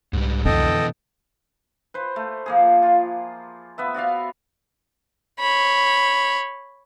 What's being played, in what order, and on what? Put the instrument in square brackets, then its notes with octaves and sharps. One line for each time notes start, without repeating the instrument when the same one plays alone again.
[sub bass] C2 [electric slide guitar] G#2 G3
[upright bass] F2 D3 [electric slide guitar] B2 E3 [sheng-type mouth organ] A4 D#5 G5
[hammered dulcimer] B4 C5
A3
F3 A#3 G#4
F4
B3 B4 E5
F#4 D5 E5 F5
[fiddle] C#5 B5